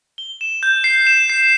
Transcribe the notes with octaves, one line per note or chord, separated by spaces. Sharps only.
G7
E7
G6
C7
E7
C7